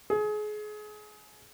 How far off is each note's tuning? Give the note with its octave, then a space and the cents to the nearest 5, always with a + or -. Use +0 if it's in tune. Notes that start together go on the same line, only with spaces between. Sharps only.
G#4 +30